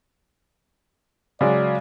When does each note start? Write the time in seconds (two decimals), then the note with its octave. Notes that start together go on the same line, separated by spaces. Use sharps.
1.41 C#3 F#3 G#3 D5